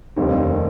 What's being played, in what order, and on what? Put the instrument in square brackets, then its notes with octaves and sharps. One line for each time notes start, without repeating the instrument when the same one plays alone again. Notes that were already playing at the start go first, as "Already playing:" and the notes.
[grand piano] F1 D#2 D#3 [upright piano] G3 C4